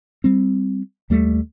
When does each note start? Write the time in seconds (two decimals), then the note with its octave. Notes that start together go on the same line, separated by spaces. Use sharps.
0.24 G3 C4
1.10 D#2 G3 A3